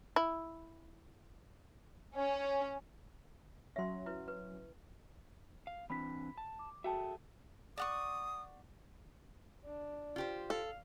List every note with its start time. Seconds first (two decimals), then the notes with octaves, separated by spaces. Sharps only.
0.16 E4
2.15 C#4
3.76 F#3 C#4 E5 C6
4.06 E4 B4
4.28 B4
5.67 F5
5.90 E3 C4 D4 B5 B6
6.38 A5
6.59 D6
6.84 F#4 G#4 A4 E5 G5 A5
7.78 D5 F#5 C#6 D#6
9.66 D4
10.16 F4 G4 C5
10.50 A4 F5